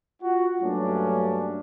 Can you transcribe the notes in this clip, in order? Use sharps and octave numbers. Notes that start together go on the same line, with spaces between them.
F4 F#4
G2 F#3 A3 A#3 C#4 D4